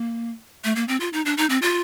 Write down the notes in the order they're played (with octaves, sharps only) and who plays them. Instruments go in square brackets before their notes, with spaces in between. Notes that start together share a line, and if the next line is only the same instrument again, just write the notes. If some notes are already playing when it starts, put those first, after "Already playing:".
Already playing: [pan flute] A#3
A3
A#3
C4
F4
D#4
D4
D#4
C4
F4